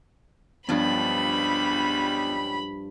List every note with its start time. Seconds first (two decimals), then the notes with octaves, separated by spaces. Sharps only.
0.69 C#2 G2 F3 G3 B3 D4 B5